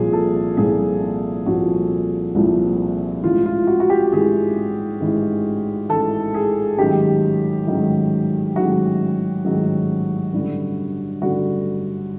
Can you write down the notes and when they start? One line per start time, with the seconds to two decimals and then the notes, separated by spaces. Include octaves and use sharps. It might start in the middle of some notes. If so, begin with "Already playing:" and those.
Already playing: C2 A#2 F3 G#4
0.13 A4
0.57 C2 A#2 F3 G#4
1.46 C2 A#2 F3 F#4
2.35 C2 A#2 F3
3.24 A1 G#2 E3 F4
3.46 F4
3.67 F#4
3.80 F#4
3.90 G4
4.12 A1 G#2 E3 G#4
5.01 A1 G#2 E3
5.90 A1 G#2 E3 A4
6.34 G#4
6.78 A1 G#2 D#3 F#3 G4
7.67 A1 G#2 D#3 F#3
8.56 A1 G#2 D#3 F#3 F#4
9.45 A1 G#2 D#3 F#3
10.33 A1 G2 D3
11.21 A1 G2 D3 F#4